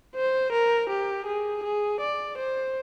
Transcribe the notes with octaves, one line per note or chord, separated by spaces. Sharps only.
C5
A#4
G4
G#4
G#4
D5
C5